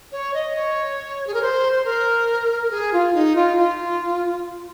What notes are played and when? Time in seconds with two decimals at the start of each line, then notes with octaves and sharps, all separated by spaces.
0.12 C#5
0.33 D#5
0.55 C#5
1.27 G#4
1.33 A#4
1.42 C5
1.72 C5
1.84 A#4
2.62 A#4
2.70 G#4
2.93 F4
3.13 D#4
3.35 F4
3.57 F4